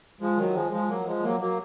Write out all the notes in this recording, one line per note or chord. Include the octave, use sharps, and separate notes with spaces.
F3 G#3
D#3 F#3
F3 G#3
F3 G#3
F#3 A#3
F3 G#3
F#3 A#3
F#3 A#3